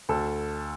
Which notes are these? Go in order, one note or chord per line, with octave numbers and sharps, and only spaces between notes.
D2 A4